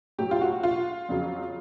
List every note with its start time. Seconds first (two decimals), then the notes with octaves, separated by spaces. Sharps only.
0.18 A2 F#3 G4
0.31 F4
0.41 F#4
0.63 F4
1.09 F2 C#3 F#3